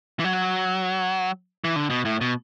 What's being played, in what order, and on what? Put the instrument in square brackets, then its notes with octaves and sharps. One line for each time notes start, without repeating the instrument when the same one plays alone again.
[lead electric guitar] E3
F#3
E3
D3
B2
A2
B2